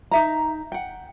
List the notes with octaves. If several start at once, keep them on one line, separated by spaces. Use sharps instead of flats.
D#4 E5 A#5
F#5 G5